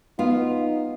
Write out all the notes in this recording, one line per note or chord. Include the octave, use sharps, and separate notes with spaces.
B3 D#4 F4